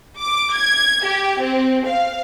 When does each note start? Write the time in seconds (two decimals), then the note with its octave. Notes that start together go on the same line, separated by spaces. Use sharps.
0.19 D6
0.54 G#6
1.05 G4
1.41 C4
1.86 F5